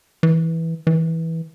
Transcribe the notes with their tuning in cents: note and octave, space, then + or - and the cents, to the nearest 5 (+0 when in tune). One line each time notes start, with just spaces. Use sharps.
E3 -10
E3 -15